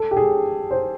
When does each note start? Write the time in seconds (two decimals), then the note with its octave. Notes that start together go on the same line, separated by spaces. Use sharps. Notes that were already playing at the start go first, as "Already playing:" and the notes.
Already playing: A4
0.11 G4
0.17 G#4
0.71 C5